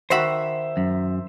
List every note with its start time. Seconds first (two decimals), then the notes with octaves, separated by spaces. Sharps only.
0.10 D#3 F#4 C5 E5 B5
0.77 F#2